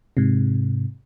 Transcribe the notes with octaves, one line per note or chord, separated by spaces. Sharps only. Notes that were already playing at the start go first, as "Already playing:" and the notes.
G#2 C3